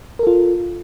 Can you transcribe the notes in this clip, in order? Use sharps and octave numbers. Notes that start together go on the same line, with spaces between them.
F4 A4 A#4